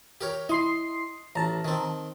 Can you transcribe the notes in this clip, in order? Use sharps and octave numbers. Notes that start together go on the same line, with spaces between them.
G4 A#4 C#5
E4 D#5 C6 C7
A1 A5 A#5
D#3 C4